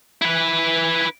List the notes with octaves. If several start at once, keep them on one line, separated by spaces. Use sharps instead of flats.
E4 B4